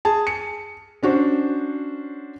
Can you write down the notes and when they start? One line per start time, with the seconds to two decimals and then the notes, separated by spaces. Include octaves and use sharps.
0.05 G#4 A5
0.27 C#7
1.03 C#4 D4 F#4 C5